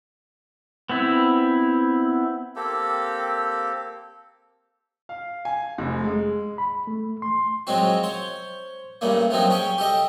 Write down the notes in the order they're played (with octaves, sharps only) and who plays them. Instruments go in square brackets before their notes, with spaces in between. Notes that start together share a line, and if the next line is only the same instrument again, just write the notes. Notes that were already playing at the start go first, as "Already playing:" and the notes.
[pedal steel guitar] B3 C4 E4
[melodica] A#3 C4 G4 A4
[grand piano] F5
G#5
F1
G#3
[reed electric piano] B5
A3
C6
[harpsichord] F3 F#3 G#3 C4 F#4
C5 C#5
G2 C#3 A3 A#3
F3 F#3 C4 D#4 F#4
C#4 G#4 C#5 G5
G4 A4 D#5 E5